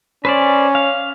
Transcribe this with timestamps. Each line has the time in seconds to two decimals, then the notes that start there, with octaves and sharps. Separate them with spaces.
0.25 C#4 B4 C5 D5
0.75 F5